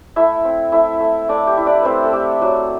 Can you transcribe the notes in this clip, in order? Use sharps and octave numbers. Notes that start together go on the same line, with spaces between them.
A3 E4 E5
C4
A3 E4 E5
A3
A3 D4 D5
G4
E4
D4 D5
A3 C4 B4 C5
A4
A3 G4
F#3 F#4